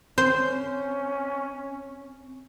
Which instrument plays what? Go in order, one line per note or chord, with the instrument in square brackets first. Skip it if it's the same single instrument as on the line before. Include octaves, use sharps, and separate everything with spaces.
[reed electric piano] C4 [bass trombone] C#4 [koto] C5